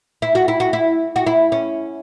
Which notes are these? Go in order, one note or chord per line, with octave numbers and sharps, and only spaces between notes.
E4
F#4
E4
F#4
E4
F#4
E4
C#4